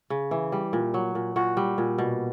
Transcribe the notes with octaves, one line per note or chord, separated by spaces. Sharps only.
C#3
E3
G3
A#2
F#3
A#2
A#2 F#4
G3
A#2
B2